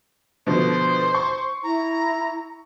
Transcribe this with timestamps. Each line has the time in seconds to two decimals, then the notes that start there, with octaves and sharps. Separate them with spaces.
0.47 B2 D3 F3 C5
1.15 C#6
1.63 E4 A#5